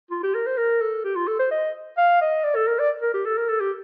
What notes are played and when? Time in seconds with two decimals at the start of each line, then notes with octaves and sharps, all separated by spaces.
0.11 F4
0.23 G4
0.34 A#4
0.46 C5
0.58 A#4
0.81 A4
1.04 G4
1.16 F4
1.27 A4
1.39 C5
1.51 D#5
1.98 F5
2.21 D#5
2.44 D5
2.56 A4
2.67 A#4
2.79 D5
3.02 A#4
3.14 G4
3.26 A4
3.37 A#4
3.49 A4
3.60 G4